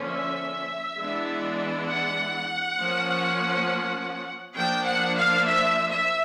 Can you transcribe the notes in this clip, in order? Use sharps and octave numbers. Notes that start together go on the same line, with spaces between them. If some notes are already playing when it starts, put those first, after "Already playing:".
Already playing: D3 F3 A#3 C#4
E5
E3 G#3 B3 D4
F#5
F3 A#3 C#4
F3 A#3 D4 G5
F#5
F5
E5
E5